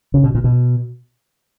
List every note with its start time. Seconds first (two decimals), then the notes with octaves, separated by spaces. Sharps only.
0.14 C#3
0.24 B2
0.35 A#2
0.44 B2